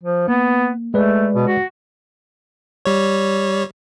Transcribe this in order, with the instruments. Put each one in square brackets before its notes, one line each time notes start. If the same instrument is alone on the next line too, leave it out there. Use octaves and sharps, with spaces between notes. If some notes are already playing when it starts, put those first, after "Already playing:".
[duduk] F3
[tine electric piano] A#3 [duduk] B3
[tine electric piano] G#3 B4 D5 [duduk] A3
[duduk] B2
F#4
[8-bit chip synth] G3 C#5